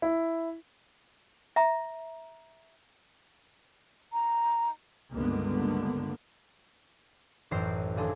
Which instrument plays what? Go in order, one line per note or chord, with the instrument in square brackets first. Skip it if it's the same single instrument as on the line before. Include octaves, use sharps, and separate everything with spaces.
[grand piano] E4
[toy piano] E5 A#5
[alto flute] A#5
[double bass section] C#2 G2 D3 A#3 B3
[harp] A1 F#2 C5 C7
A#1 D#2 D4 G#4 A4 C6